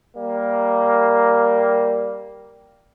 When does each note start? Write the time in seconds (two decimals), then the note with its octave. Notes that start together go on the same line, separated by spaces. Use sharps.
0.17 G3 A#3